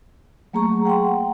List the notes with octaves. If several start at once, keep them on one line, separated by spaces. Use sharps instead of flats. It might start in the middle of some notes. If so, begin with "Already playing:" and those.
F#3 A3 A#3 G#4 A#5 C#6
F#5 G5 A#5 C6